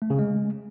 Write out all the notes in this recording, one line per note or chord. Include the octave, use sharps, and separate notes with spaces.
A3
C#3
G#3